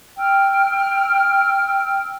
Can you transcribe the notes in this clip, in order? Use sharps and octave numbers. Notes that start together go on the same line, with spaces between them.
G5 E6 F6